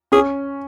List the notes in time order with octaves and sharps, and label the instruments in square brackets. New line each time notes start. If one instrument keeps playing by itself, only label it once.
[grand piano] C#4 [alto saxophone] G#4